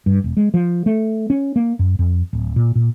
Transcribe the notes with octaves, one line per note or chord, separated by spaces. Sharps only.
G2
E1
G#3
F3
A3
C#4
A#3
F#2
F2
D1
A#2
A#2